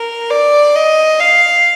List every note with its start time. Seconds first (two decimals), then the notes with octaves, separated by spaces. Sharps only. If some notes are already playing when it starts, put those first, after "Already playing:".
Already playing: A#4
0.30 D5
0.76 D#5
1.20 F5